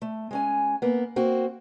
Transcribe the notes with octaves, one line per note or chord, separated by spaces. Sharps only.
A3
G#3 C#4 G#5
A#3 B3
A#3 C4 F#4